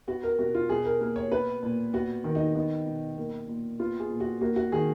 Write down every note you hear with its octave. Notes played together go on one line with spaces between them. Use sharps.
B3 F#4
A#4
B2 F#4
F4
B2 G#4
A#4
A#3 A#4
C#5
B3 B4
A#2
B3 F#4
D#3
D#4
B3 D#4
B2
A#3
A#2
B3 F4
G#4
A#2
F#4
A#3 F#4
F#4
D#3 G#4